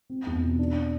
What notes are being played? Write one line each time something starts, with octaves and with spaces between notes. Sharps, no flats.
C4
E2
B2
D4